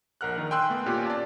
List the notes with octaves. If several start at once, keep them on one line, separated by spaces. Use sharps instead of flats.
A#1 A#4 F#5 F6 F#6
D#3
G5 G#5 C6 E6 F#6
A3 B3
A#2 C#4 F4 G4
D5 A5